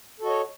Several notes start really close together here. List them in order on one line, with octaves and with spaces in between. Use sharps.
A4 F#4 D#5 C#5